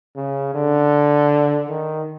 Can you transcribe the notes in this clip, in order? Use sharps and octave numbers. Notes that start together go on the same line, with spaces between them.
C#3
D3
D#3